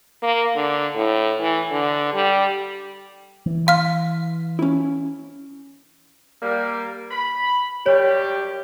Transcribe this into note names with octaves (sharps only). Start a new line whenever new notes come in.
A#3
D3
A2
E3
D3
G3
E3
F5 C6 F6
C#4 E4
G3 A#3
B5
F#2 G3 G4 C#5